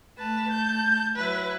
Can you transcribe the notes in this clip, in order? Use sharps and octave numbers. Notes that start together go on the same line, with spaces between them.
A3 B4 A5
G6
F#3 E4 B4